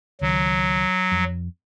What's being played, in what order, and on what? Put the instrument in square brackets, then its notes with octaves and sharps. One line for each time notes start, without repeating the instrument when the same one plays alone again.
[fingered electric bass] C#2 D#3 [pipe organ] F#3
[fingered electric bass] F2